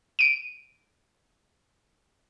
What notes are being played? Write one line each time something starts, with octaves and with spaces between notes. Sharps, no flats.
D7 D#7